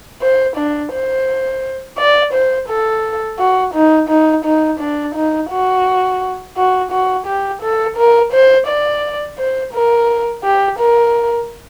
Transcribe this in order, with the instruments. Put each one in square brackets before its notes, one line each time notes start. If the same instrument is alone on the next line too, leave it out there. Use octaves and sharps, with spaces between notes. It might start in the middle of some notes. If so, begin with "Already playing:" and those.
[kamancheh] C5
D4
C5
D5
C5
A4
F#4
D#4
D#4
D#4
D4
D#4
F#4
F#4
F#4
G4
A4
A#4
C5
D5
C5
A#4
G4
A#4